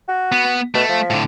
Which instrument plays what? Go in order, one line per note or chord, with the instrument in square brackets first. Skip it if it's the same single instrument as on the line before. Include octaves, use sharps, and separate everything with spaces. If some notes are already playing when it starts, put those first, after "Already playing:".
[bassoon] F#4
[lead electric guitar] B3
[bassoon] B2 [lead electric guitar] A3
[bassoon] F3
[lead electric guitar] A2 D3